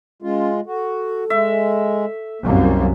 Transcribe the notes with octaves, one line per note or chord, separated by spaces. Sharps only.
G#3 C#4 F4
F#4 A4
G#3 E5
C2 F#2 A#3